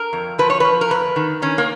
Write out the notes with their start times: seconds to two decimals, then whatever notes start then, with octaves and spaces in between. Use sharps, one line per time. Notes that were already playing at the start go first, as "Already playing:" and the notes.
Already playing: A#4
0.13 F2
0.39 F3 B4
0.50 C#5
0.60 F3 B4
0.81 A#4
0.90 F2 B4
1.16 D#3
1.42 D#3 C#4
1.58 A#3